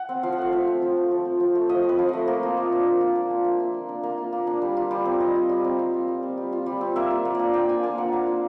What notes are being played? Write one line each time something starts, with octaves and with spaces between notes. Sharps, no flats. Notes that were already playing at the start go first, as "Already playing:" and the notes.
Already playing: F#5
C4
F3 F5
F#5
A3 F5
F3 E5
C4
F3
A3
F3
C4
F3
A3
F3 D#5
C4
B4
F3
A3 D#5
A#3
F4
A#3
D4
A#3
F4
A#3
D4
A#3 E5
F4
A#3
D4
A#3
F4
A#3
D4
G3
F4
G3
C4
G3 D#5
F4
G3
C4
G3 F5
F4
G3
C4
G3
F4
G3
C4
A#3 E5
F4
A#3
D4 D5
A#3 G5
F4 G#5
A#3 A5
D4 F#5
A#3 F5
F4